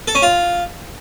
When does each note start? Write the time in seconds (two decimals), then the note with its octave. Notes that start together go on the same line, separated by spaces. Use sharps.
0.08 A4
0.15 C#4
0.22 F4